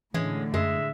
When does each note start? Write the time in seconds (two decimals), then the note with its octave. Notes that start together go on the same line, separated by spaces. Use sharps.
0.14 A2 D3 E3 G#3 C#4
0.54 F#2 G#3 E5